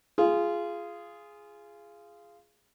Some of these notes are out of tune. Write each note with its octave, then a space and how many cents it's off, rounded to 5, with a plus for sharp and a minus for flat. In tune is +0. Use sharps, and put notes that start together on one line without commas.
F4 -15 G#4 +0